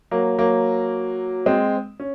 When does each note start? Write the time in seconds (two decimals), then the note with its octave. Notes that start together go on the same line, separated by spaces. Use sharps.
0.11 F#3 A#3
0.38 F#3 A#3
1.46 G#3 C4
2.00 C#4